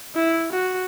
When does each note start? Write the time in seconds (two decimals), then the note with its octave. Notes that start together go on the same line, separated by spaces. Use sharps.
0.15 E4
0.52 F#4